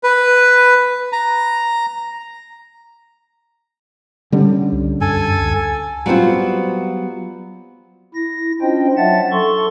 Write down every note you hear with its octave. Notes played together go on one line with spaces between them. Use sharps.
B4
A#5
D3 G3 C#4
C2
F#2 A4 G#5
C#2
F#3 G3 B3 C4 F4
E4 A#6
C#4 D4 F4 C5 D#5 G5
F#3 E5 F#5 A5 A6
A4 C6 C#6